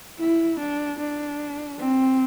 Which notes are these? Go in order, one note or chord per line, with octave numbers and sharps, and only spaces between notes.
E4
D4
D4
C4